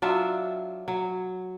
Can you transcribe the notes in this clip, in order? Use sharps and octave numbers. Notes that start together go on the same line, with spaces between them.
F#3 D4 F4 E5
F#3